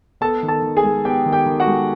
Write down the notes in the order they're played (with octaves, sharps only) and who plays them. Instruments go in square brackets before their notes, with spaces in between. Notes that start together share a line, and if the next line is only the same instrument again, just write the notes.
[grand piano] B3 A4 A5
D#3
A4 A5
D#3
G#4 G#5
G#3
B3 G4 G5
D#3
G4 G5
D#3
F#4 F#5
G#3